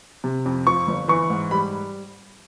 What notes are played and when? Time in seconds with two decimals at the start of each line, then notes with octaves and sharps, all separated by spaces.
0.24 C3
0.46 F2
0.67 F3 C#6
0.87 G1
1.08 E3 C#6
1.30 G#2
1.51 G3 B5